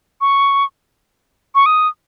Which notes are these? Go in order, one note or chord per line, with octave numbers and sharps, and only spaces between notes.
C#6
C#6
D#6